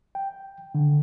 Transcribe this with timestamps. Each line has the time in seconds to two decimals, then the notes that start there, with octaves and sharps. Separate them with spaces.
0.15 G5
0.75 D3